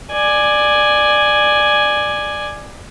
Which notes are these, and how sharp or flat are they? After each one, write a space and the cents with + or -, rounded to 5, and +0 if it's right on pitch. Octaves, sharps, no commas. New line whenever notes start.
D5 +15 G#5 +0